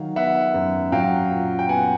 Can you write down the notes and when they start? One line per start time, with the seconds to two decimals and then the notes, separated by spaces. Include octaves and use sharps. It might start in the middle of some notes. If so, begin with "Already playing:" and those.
Already playing: D#3 F#3 F5
0.16 B3 E5 F#5
0.54 F#2
0.92 F#3 F5 G5
1.31 A#2
1.59 G5
1.69 B3 F#5 G#5